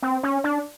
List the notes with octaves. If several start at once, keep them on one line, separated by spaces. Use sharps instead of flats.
C4
C#4
D4